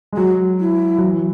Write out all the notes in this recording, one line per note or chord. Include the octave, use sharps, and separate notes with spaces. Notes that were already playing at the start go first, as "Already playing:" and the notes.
G#3
F#3 F#4
E4
F#3
E3